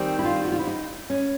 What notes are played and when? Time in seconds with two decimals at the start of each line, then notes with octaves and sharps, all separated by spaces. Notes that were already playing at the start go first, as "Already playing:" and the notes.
Already playing: D#3 G3 C4
0.19 E4
0.25 F4
0.45 F#4
0.52 F4
0.59 E4
0.67 D#4
1.10 C#4